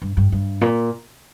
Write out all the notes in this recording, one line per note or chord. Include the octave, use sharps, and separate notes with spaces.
G2
G2
G2
A#2